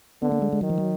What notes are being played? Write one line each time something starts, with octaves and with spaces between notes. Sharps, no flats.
D3 B3
A#3
G#3
G#3
D#3 F#3
F3
F#3